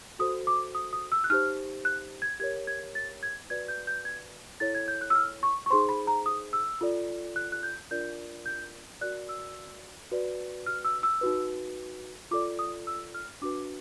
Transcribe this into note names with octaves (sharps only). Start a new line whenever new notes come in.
F#4 A4 C5 D#6
D6
D#6
D#6
E6
F#6
D#4 G4 C5 F6
F#6
G#6
G4 A#4 C#5 G#6
G#6
A6
G#6
F#4 B4 D5 G#6
G6
G6
G#6
E4 A4 C#5 A6
G#6
G6
F#6
E6
F6
C#6
C#6
D#4 G#4 C5 C6
B5
A#5
D#6
E6
F4 A4 D5
F#6
F#6
G6
D4 F4 A#4 D5 G6
G6
F#4 A#4 D5 F#6
E6
F#4 B4 D5
F6
E6
E6
D#4 F#4 B4
F4 A4 D5 D6
D#6
E6
F6
D4 F#4 B4 D6